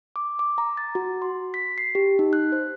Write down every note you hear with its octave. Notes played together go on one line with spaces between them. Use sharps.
D6
D6
A#5
A6
F#4
C6
B6
C7
G4
D#4
F#6
C5